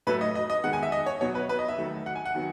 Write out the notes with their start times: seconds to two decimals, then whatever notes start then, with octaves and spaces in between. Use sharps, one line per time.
0.07 A2 F#3 A3 B4
0.21 D#5
0.35 D#5
0.50 D#5
0.64 D#3 G#3 B3 F#5
0.73 G#5
0.83 E5
0.92 D#5
1.06 C#5
1.21 B2 F#3 B3 C#5
1.35 B4
1.49 B4
1.59 D#5
1.68 E5
1.78 D#3 F#3 A3
2.06 F#5
2.15 G#5
2.25 F#5
2.35 D#3 F#3 B3